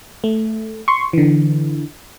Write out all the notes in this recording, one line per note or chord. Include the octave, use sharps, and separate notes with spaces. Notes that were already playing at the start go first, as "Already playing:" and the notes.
A3
C6 C#6
D3 E3